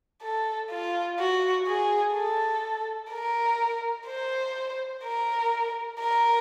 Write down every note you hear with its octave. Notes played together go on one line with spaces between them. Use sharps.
A4
F4
F#4
G#4
A4
A#4
C5
A#4
A#4